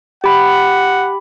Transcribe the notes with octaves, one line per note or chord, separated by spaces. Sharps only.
G4 F#5 B5